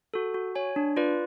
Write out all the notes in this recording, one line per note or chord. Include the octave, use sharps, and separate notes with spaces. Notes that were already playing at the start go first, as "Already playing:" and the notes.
F#4 A4
F#4
C#5 G#5
D4
F4 B4 D5